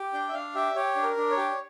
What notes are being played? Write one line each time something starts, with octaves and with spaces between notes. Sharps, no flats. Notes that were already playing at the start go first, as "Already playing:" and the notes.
Already playing: G4
D4 G5
E5
D4 F5
G4 E5
G4 C#5
D4
A#4
D4
C#5
G4